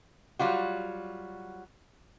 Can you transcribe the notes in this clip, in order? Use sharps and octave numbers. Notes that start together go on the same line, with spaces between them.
F#3 G3 F4 F#4